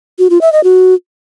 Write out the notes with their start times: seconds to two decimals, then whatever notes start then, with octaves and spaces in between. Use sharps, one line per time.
0.19 F#4
0.30 F4
0.41 E5
0.52 D#5
0.64 F#4